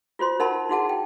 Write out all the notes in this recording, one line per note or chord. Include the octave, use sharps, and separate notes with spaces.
F4 F#4 C5 C6
D#4 A#4 F#5 A5 B5 C6
D#4 E4 F#4 G#4 F#5 A5
G5